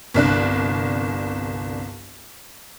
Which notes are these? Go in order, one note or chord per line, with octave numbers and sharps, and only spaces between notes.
G1 C2 D4 F#6